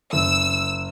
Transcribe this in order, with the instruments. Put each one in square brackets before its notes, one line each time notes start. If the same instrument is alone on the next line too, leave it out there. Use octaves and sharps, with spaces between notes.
[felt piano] F#1 [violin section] E6